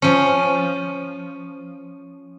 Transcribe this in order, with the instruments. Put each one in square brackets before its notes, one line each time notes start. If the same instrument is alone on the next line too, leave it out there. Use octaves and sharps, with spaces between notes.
[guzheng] F3 C#4